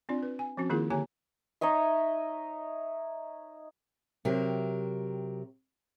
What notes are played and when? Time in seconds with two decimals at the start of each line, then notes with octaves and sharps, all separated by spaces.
0.09 C4 D4 F4 D5
0.23 B4
0.39 G#5
0.57 F3 C4 C#4 F#4
0.70 D#3 A#3 E4 F4 G#4 A#4
0.90 D3 A#3 G4 C#5 G#5 A#5
1.61 D#4 C#5 D#5 E5
4.25 C3 F#3 G4 A#4